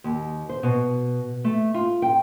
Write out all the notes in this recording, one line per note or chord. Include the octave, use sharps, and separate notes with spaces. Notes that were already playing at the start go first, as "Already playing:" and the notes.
D#2
C5
B2
A3
F4
G5